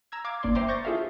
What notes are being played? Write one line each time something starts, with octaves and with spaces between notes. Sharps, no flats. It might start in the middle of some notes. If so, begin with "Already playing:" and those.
A#5 E6 G#6
F5 D6 G#6
G1 A#3 D5 C6
C5 E5 G5 A#5 C6 D6
C#6 G6 A6 A#6
F4 G#4 A4 E5 F5